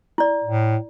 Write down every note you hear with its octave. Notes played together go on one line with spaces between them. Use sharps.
E4 D5
A2